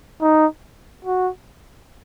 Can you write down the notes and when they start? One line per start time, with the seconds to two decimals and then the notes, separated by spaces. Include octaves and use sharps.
0.21 D#4
1.05 F#4